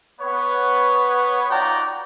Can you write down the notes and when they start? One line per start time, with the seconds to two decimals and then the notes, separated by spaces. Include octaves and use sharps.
0.21 B3 B4 C#5
1.51 D#4 F4 F#4 D5 G5 A#5